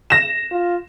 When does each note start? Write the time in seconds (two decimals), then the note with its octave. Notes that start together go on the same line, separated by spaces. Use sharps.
0.10 A#6 E7
0.51 F4